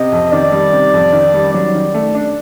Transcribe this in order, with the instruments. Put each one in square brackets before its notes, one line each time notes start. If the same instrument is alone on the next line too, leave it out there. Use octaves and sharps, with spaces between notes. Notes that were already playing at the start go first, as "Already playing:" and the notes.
Already playing: [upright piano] C3 [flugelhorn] D#5
[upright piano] F2
[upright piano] D#3 [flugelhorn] D5
[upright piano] G3
C3
F2
D#3
G3
[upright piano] F#3 [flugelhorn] D5
[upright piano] D#3
A3
D4